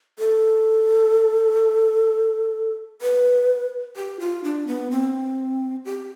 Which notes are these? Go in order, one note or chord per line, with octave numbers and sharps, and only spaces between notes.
A4
B4
G4
F4
D4
B3
C4
G4